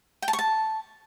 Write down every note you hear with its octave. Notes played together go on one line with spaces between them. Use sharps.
G5
A5
C#6
A5